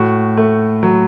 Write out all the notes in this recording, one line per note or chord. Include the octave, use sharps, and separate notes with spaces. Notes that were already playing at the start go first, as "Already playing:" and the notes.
Already playing: A2 F#4
A3
F#3